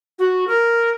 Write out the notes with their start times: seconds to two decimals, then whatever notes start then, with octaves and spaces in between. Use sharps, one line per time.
0.19 F#4
0.47 A#4